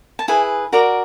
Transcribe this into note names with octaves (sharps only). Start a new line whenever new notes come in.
A5
E4 G#4 B4 G#5
F#4 A#4 D5 A#5